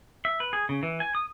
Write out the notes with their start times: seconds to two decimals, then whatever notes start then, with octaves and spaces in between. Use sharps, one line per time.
0.25 E5
0.40 B4
0.53 G#4
0.69 C#3
0.83 E3
1.00 G#5
1.15 D#6